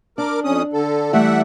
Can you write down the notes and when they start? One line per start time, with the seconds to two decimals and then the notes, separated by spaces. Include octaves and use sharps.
0.18 D4 A#4 D6
0.44 F2 C#4 D#6
0.73 D3 A4
1.13 E3 G3 A3 E5 F#5